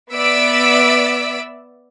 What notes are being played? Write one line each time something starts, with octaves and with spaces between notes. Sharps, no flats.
B3 D5 E5 E6 B6 D7